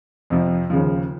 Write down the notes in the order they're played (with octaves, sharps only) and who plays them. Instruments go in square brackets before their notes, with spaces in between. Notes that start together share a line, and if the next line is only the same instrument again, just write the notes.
[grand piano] F2 C3 F3
D#2 C#3 F3